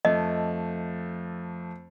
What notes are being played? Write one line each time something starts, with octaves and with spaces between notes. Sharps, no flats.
F2 A3 D#5